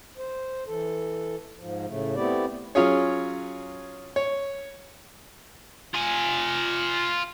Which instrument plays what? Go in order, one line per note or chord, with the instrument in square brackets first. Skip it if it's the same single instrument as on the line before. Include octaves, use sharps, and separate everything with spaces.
[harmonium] C5
E3 A4
G#2 F3
A2 C#3 A3
A3 B3 C4 E4 G4 D5
[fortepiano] F#3 C#4 F4 G#4 C#5
C#5
[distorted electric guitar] F4 G#5